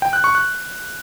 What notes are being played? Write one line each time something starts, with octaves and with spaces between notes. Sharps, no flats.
G5
F#6
C#6
F#6